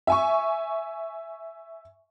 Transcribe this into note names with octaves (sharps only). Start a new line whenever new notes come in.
E5 G#5 C#6